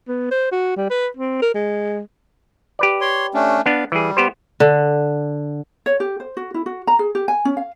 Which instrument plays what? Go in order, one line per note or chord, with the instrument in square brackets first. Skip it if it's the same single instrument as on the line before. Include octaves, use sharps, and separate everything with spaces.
[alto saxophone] B3
C5
F#4
G3
B4
C4
A#4
G#3
[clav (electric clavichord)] G4 B4 D5
[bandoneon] C#5 C6
A3 C#4 D4
[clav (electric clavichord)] B3 D4 [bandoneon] F5
[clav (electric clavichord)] E3 G#4 [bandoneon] G3
[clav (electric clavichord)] B3 G4 C5
[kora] D3
[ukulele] C#5
G4
C5
F#4
E4
F#4
A#5
G#4
G4
G#5
C#4
F5